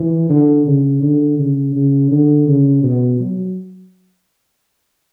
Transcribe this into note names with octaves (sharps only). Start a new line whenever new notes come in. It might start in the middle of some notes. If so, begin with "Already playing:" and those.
Already playing: E3
D3
C#3
D3
C#3
C#3
D3
C#3
B2
F#3